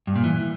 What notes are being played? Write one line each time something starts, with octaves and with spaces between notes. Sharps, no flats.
G2
A#2
E3